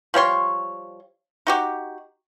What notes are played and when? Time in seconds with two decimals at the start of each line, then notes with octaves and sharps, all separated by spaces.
0.14 F3 G3 C#5 C6
1.47 D#4 F#4 G4